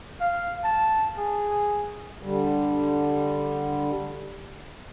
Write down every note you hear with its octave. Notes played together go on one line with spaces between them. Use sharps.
F5
A5
G#4
D3 G3